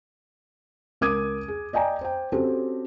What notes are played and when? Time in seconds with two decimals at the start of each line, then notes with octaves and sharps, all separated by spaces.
1.01 C#2 A#4 D6 D#6 G#6 D#7
1.48 G#4
1.73 D5 D#5 G5 G#5 A#5
2.01 C5 G5
2.32 C4 C#4 F#4 G4 A4 C5